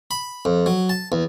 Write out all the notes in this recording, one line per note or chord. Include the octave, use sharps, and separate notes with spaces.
B5
F2
F#3
A5
E2